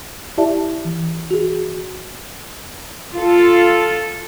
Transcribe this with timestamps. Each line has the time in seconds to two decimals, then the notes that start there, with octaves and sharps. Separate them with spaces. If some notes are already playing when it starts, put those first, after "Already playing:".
0.38 E4 G4 D5 E5 A5
0.85 E3
1.31 F#4 G#4
3.13 F4 A4